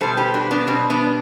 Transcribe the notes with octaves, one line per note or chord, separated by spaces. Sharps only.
B2 G3 A4 C5
G4 B4
D4 F#4
B3 D4
B2 G3 C4
B3 D4